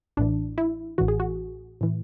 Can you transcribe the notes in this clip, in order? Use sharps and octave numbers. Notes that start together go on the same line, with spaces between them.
A1 A2 E3 D4
E4
A1 A2 E3 F#4
G#4
F#4
A2 E3